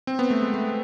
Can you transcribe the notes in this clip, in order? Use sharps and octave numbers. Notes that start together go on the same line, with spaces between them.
C4
B3
A3
G#3
A3